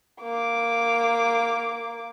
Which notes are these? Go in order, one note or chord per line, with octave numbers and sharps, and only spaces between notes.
A#3 D6